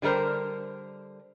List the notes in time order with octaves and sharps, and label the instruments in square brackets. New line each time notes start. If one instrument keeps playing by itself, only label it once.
[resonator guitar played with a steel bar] D3 F#3 G3 A#4 C5